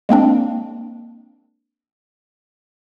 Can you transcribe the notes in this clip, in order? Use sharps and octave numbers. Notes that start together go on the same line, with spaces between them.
G#3 A#3 C4 D4